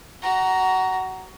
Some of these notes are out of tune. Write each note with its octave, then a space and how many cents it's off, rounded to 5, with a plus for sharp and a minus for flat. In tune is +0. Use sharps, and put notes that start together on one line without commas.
F#4 +20 A#5 +0